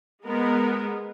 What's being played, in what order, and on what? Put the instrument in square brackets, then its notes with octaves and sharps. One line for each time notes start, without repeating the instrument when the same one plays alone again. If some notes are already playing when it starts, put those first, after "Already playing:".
[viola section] G#3 B3 A#4